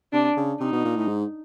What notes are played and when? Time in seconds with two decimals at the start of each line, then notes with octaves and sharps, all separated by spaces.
0.13 C3 D4
0.37 C#3
0.60 C3 D#4
0.72 B2
0.85 A#2
0.96 A2
1.08 G#2